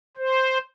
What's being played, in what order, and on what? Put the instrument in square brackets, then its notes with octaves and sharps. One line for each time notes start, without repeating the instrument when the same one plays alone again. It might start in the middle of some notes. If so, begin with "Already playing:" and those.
[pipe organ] C5